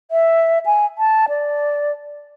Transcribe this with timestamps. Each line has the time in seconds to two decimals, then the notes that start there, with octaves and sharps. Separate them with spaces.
0.11 E5
0.66 G#5
0.98 A5
1.29 D5